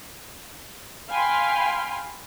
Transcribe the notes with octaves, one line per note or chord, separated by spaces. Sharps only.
F5 G5 G#5 B5 C6 F6